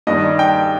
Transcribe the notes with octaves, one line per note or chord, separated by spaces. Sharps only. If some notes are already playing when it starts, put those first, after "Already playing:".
G2 D#3 G3 D#5
G5